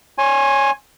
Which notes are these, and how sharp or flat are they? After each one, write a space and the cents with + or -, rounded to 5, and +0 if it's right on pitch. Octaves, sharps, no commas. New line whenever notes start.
C#5 +0 G#5 +0 C6 +40